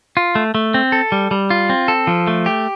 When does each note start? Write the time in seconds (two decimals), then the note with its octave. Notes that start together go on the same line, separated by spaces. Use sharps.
0.17 F4
0.35 A3
0.55 A3
0.74 C4
0.92 A4
1.12 G3
1.31 G3
1.50 F4
1.70 C4
1.88 A4
2.07 F3
2.27 A3
2.46 G4